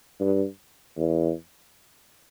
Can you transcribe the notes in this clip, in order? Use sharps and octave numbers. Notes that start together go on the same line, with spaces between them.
G2
E2